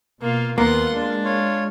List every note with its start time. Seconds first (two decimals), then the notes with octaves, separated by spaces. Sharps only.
0.21 B2 A#3 F4
0.58 D#2 A#3 B3 F4 F#5 C6
0.94 G#3 D4
1.24 F4 C#5